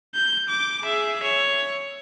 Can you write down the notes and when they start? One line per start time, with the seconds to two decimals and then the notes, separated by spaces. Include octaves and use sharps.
0.14 G6
0.49 D6
0.83 G#4 E5
1.23 C#5